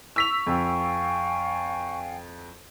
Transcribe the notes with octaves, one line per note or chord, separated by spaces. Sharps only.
C#6 E6 B6 F7
F2 F5 G5 G#5